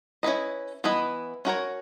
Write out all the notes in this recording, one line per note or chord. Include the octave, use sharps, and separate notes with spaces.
C#4 E4 B4 D#5
E3 B3 E4 B4 D#5
C#4 F#4 A#4 C#5